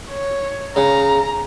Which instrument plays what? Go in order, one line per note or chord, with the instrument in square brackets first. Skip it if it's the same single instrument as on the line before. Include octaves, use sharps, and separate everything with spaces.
[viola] C#5
[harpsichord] C#3 [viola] A#5